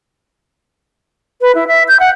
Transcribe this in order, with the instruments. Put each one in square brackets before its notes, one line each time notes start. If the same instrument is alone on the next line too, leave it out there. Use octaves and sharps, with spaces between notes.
[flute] B4
E4
E5
G6
F#5